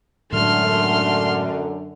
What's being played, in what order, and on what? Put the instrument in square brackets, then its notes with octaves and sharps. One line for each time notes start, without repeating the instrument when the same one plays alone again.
[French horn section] F#2 D3 [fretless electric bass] A2 F#3 G#3 [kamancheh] A3 [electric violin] C6 F6